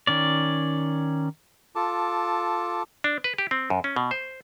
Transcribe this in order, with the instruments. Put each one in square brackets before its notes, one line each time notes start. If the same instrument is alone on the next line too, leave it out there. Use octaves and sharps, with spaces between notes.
[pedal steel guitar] D#3 C#4 D5
[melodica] F4 A4 A5 D6
[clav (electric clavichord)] D4
B4
G4
C4
F#2
C#4
B2
C5